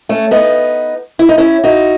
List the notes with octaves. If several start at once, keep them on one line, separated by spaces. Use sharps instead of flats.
A3 C#4
B3 D#4
E4
D#4
C#4 E4
D#4 F#4